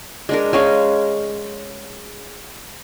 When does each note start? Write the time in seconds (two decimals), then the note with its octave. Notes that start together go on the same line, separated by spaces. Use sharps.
0.29 G#3 D4 A#4
0.53 G#3 C#4 F5